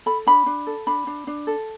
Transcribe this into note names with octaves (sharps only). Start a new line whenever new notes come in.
A4 B5
D4 B5
D4
A4
D4 B5
D4
D4
A4